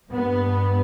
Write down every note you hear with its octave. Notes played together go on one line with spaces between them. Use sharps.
G2 B3